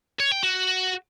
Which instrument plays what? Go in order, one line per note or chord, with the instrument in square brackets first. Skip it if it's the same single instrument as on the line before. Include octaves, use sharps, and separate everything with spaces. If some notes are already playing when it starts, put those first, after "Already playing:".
[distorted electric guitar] C#5
G5
F#4